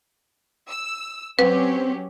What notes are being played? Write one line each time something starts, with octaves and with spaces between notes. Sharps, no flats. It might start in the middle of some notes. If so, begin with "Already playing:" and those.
E6
F#3 C4 C#4 G4 B4